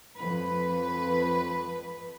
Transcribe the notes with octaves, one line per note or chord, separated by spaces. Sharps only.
F2 B4